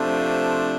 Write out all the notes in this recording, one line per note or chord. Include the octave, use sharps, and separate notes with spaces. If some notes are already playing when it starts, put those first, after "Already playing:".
Already playing: C3 F3 A3 D4